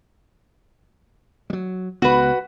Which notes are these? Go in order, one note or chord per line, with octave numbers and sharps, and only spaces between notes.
F#3 G3
C#2 B3 F#4 B4